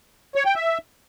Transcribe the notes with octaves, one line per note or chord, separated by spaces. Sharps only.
C#5
G5
E5